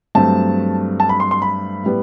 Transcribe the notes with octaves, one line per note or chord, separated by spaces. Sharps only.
G2 F#3 A3 C4 A5
A5
B5
C6
C6
B5
A2 G3 B3